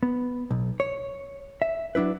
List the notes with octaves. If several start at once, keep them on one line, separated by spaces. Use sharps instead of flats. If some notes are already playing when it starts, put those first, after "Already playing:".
B3
B1
C#5
E5
F#3 D4 E4 B4